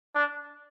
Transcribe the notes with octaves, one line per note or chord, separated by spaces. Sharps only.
D4